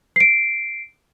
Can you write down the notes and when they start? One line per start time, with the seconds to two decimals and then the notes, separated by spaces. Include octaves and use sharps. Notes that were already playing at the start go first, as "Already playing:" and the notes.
0.16 C7 D7